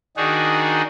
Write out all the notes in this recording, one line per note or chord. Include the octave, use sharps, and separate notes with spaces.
D#3 D4 D#4 F#4 G#4